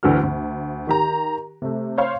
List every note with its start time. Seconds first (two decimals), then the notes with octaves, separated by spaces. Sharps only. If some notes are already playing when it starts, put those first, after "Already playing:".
0.03 D2 D3 E3 F#4 F6
0.23 D2
0.87 D#3 G4 A#5
1.62 C3 A3
1.98 C5 C#5 F5 C6